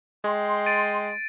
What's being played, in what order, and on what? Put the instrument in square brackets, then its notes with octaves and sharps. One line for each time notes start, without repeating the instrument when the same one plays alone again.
[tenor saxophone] G#3 [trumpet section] G5 C6
[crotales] A6 D7 D#7